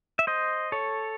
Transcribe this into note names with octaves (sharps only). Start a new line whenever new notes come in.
E5
C5 D#5
A4 C#5